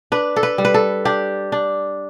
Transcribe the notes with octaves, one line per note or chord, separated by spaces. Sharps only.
D4 B4
A4
B4
G3
B4
A4
D4 G4
D4